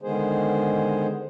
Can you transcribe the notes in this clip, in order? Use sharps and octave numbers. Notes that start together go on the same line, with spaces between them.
D3 D#3 G#3 B3 G#4 C5